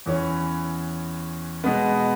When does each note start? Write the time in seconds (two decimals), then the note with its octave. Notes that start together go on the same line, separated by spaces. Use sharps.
0.06 E2 E3 C#4
1.64 B2 G#3 B3